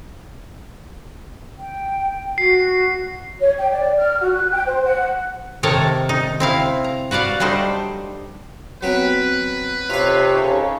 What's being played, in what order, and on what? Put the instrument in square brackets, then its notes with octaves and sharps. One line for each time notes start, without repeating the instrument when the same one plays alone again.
[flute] G5
[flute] F#4 [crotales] C7
[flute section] C#5
G5
D5
F6
F#4
F#6
G5
C5
F#5
[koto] C3 D#3 D#4 A4 A#4 C#5
D#4
C4 E4 F5
A#5
F#4 B4 D5 F5 F#5
F#3 G3 A3 D4 D#4 C5
[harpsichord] F#3 B3 C4 [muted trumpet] B4
[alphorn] C3 [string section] D#4 A4 C#5 [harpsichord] F4 F5
[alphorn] C#3